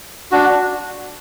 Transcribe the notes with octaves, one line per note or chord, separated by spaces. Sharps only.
D4 F#4